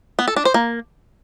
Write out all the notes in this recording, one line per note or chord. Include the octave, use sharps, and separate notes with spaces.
B3
A4
D4
C5
A#3